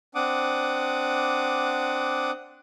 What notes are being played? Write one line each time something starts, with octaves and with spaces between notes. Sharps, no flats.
C4 D4 F#5 D6 D#6